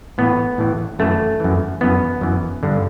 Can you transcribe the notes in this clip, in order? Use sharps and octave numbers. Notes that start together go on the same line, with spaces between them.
A2 E3 B3
A2 E3
F#2 E3 A3
F#2 E3
F#2 E3 B3
F#2 E3
G2 D3